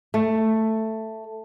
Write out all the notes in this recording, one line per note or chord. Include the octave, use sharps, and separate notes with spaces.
A3